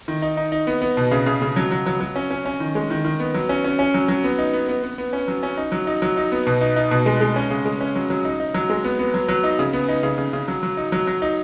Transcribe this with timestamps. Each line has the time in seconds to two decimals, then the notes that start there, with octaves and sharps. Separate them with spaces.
0.08 D#3
0.22 D#4
0.37 D#4
0.52 D#4
0.67 B3
0.82 B3
0.97 B2
1.11 C#3
1.26 C#3
1.42 C#3
1.56 F#3
1.71 F#3
1.86 F#3
2.01 F#3
2.16 C#4
2.31 C#4
2.46 C#4
2.60 D#3
2.75 G#3
2.90 D#3
3.05 D#3
3.20 B3
3.35 F#3
3.49 C#4
3.64 C#4
3.79 C#4
3.94 F#3
4.08 F#3
4.24 B3
4.38 D#4
4.53 B3
4.68 B3
4.83 B3
4.98 B3
5.13 C#4
5.28 F#3
5.43 C#4
5.57 D#4
5.72 F#3
5.87 D#4
6.02 F#3
6.17 D#4
6.32 B3
6.47 B2
6.61 D#4
6.76 D#4
6.91 B2
7.06 G#3
7.21 G#3
7.36 C#4
7.50 C#3
7.65 G#3
7.81 C#4
7.96 F#3
8.10 F#3
8.25 D#4
8.40 D#4
8.54 F#3
8.70 G#3
8.84 B3
8.99 B3
9.14 F#3
9.29 F#3
9.44 D#4
9.59 C#3
9.73 B3
9.88 D#4
10.03 C#3
10.18 C#3
10.33 C#3
10.48 F#3
10.63 F#3
10.77 D#4
10.92 F#3
11.07 F#3
11.22 D#4